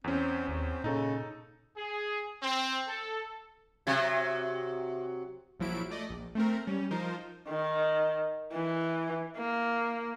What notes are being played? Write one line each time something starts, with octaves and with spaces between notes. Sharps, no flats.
E2 C4 C#4
D#2 C4
A#2 C#3 D#4 A4
G#4
C4
A4
C3 F#3
A#1 F3 F#3 E4 D7
A3 D5 D#5
A#1
A3 C4 A#4
G3 C#4
F3 D#4 A#4 C5
D#3
E3
A#3